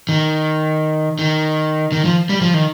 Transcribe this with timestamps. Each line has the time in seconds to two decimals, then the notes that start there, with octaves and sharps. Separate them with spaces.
0.09 D#3
1.19 D#3
1.92 D#3
2.05 F3
2.29 G3
2.41 F3
2.54 D#3